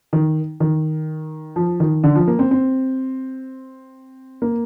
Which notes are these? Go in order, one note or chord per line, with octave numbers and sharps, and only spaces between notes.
D#3
D#3
F3
D#3
D3
F3
A#3
C4
C4
A#3